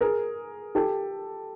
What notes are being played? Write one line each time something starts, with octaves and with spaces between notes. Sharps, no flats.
G#4 A#4
G4 A4